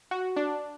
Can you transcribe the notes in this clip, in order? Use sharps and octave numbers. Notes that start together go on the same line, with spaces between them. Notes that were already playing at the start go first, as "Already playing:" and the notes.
F#4
D4